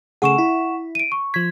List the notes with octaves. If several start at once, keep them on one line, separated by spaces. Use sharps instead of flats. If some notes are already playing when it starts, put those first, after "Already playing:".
C#3 A3 G#4 F#5 C#6 E7
E4
D7 D#7
C#6
F3 G#6 B6